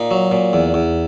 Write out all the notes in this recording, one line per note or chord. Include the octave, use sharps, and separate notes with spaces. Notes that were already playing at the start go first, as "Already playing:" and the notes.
Already playing: A#2 D#4
F#3
A#2
E2
E2